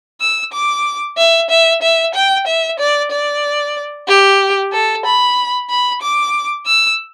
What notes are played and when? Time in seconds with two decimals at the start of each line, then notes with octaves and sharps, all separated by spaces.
0.21 E6
0.53 D6
1.18 E5
1.50 E5
1.82 E5
2.14 G5
2.47 E5
2.79 D5
3.12 D5
4.08 G4
4.73 A4
5.05 B5
5.70 B5
6.02 D6
6.67 E6